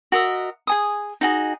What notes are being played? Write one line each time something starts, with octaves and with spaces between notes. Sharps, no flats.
F#4 A#4 D#5 E5
G#4 G#5 D#6
D#4 F#4 G#4